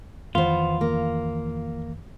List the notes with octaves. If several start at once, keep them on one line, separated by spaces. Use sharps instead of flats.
F2 D#3 E3 B3 F4 C5
A#3